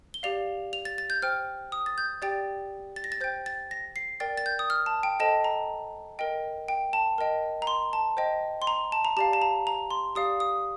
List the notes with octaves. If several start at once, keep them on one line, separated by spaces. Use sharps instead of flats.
G7
G4 D5 F5 F7
F7
A6
A6
G6
C5 G5 F6
D#6
A6
G6
G4 D5 G5 A6
A6
A#6
A6
C5 G5 G6
A6
A#6
C7
A#4 D5 G5 A6
A6
G6
D#6
F6
A5
G5
A4 C5 D#5 G5 A5
A#5
A#4 D#5 G5
G5
A5
A#4 D#5 G5
A#5
C6
A5
C5 D#5 G5
C6
A#5
A5
A#5
G4 D5 F5 A5
A5
A#5
A#5
C6
G4 D5 F5 D#6
D#6